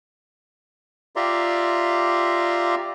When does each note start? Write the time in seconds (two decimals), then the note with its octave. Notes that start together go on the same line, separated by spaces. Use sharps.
1.16 F4 G4 D5 E5 A#5 C6